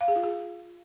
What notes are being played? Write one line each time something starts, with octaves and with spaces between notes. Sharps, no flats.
F5
G#4
F4
G#4